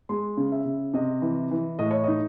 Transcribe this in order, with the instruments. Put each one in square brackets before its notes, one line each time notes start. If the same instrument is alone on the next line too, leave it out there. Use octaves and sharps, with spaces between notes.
[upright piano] G#3 C6
C#3
E5
C#3
C3 D#5
E3
E3
A2 D#5
C#5
D#4 D#5